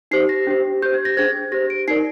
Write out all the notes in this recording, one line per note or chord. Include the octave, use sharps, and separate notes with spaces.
D#4 G4 C5 C7
A#6
D4 G4 C5
G4 C5 G6
G#6
A#6
D4 G#4 C5 G#6
G4 C5 A#6
D7
D#4 A#4 D5 C7